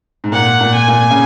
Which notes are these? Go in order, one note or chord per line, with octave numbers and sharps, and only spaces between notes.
G#2
A#2 F#5
A#2
G#5
A#2
C#3